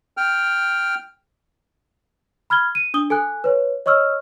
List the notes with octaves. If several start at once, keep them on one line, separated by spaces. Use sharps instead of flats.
G5 F6
B5 F6 G#6 G7
D#7
D4 D#6 G7
A4 G#5 F#6
B4 C#5
C#5 D#5 C#6 E6 F6